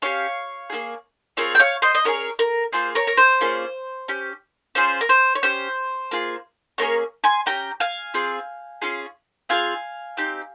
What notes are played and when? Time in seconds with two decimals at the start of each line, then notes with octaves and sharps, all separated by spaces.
0.02 C#4 G4 C#5 F5
0.70 A#3 F4 G#4
1.37 C4 F4 G#4 A#4 C#5
1.55 G5
1.60 C#5 F5
1.82 C5 D#5
1.95 D#5
2.05 C#4 F4 G#4 A#4 C#5
2.39 A#4
2.72 A#3 F4 G#4 C5
2.95 A#4 C#5
3.07 A#4
3.17 C5
3.41 A#3 C#4 F4 G#4
4.08 C#4 G4
4.75 C#4 F4 G#4 C5
5.01 A#4
5.09 C5
5.35 C#5
5.43 C#4 G4 C5
6.11 A#3 F4 G#4
6.78 A#3 C#4 G#4 A#4 C#5
7.24 G#5 C6
7.46 C#4 G4 G5 A#5
7.80 F5 G#5
8.14 C4 F4 G#4
8.82 C#4 F4 G#4
9.49 C4 F4 G#4 F5 G#5
10.17 C4 D#4 G4